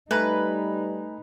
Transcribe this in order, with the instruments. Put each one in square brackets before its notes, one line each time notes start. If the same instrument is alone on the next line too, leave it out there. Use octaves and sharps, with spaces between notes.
[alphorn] G3 [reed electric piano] A3 G#5 A#5 [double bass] D#4 [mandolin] B4